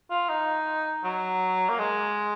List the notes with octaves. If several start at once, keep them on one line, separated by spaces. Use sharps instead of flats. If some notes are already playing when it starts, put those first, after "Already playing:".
F4
D#4
F#3
A#3
G#3